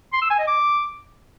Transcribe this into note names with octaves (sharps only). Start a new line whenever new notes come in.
C6
E6
G#5
D#5
D6